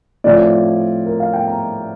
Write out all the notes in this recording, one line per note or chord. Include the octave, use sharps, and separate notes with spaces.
A2 F3 C4 F4 D5
A#4
F5
G5
A#5